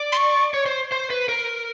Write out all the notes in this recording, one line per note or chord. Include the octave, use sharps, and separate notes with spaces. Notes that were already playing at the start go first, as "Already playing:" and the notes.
Already playing: D5
C6
C#6
C#5
C5
C5
B4
A#4